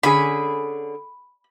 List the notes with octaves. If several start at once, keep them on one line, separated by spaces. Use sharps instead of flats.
D3 C#4 G#4 B5